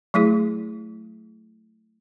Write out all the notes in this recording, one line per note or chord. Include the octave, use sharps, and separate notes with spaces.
F#3 A3 E4 G#4